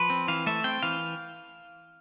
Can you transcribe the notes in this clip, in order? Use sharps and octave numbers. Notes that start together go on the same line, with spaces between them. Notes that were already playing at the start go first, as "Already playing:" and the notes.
Already playing: F3 B4
C4
E3 F5
A3 E5
C4 G5
E3 F5